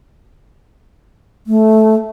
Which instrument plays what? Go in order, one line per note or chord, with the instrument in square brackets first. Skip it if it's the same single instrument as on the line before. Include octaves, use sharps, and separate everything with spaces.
[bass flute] A3